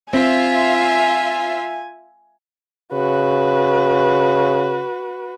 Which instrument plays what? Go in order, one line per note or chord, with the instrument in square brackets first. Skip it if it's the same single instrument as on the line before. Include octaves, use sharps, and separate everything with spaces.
[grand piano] C4 [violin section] F4 E5 [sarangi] G#5
[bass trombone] C#3 [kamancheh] F#4 B4